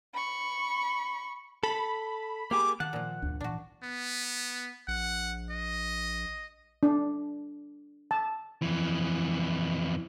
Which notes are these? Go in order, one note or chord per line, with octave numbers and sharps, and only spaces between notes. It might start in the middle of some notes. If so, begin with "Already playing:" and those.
B5 C#6
A4 B5
A#3 G4 G#4 D6
D#3 F#5 A5
A#2 F3
D2 G2 D4
G#1 A#2 E3 D4 F#4
B3
A#1 F#5
D#5
D4
A5
F2 E3